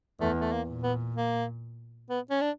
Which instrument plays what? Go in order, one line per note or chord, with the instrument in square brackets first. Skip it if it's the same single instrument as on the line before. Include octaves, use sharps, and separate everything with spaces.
[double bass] E2 [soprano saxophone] A3
[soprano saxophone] A3
A#3
[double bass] A#2
[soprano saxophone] B3
A#3
B3
C#4
D4